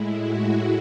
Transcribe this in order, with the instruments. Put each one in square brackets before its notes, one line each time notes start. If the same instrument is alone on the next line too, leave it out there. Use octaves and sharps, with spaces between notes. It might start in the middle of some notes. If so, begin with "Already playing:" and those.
Already playing: [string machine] A2 G#3 E4
F#4